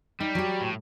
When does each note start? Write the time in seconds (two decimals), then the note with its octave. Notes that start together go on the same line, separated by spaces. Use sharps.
0.20 G3 D#4
0.35 F#3 G4
0.62 A2